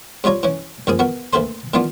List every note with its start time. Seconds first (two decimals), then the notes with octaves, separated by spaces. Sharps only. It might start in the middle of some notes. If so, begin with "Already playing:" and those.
0.24 C3 G3 F4 C#5 A#5
0.43 E3 C#4
0.87 F#2 F3 A#3 G#4 D#6
0.99 B3 F#4 A#4
1.33 D2 A3 A#3 B4 C5 C6
1.74 D#3 E3 B3 D4 F4